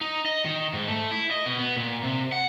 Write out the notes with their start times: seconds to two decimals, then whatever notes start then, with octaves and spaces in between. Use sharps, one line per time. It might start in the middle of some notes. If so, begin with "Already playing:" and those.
0.01 D#4
0.26 D#5
0.45 D#3
0.73 G#2
0.88 A3
1.11 E4
1.31 D#5
1.46 B2
1.59 B3
1.77 A#2
2.03 C3
2.32 F#5